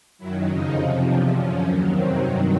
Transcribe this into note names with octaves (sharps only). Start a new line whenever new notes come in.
F#2 D#3 F#3 E4
F2 C#3 F3 D#4
F2 C3 F3
E2 C3 F3 D4
F#2 D3 F3 C#4
D#2 D#3 F#3
F2 C3 D#3 F#3 C4
G2 D#3 F#3